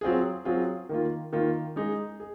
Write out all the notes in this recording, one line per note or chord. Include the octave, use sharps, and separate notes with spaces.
F#3 C4 F4 G#4
F#3 C4 F4 G#4
D#3 A#3 F4
D#3 A#3 F4
G#3 D#4 G#4
G#4